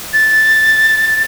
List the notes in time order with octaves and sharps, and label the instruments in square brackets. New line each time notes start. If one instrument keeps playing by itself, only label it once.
[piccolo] A6